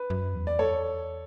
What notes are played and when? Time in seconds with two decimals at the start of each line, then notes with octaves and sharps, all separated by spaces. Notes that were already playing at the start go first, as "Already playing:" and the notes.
Already playing: B4
0.10 F#2
0.35 E2
0.47 D5
0.59 A4 C#5